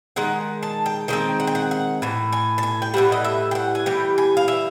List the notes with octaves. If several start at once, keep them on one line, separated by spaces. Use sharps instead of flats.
D#3 G#3 F#5
A5
G5
D#3 G#3 C4 G5
F#5
G5
F#5
F#5
A2 E3
G#5
A5
G#5
G5
A2 E3 G3 F#5
D#5
E5
G5
F#5
G#5
E3 G3 G5
G#5
F5
E5